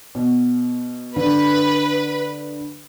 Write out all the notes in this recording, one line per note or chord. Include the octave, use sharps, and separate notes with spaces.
B2
D3 B4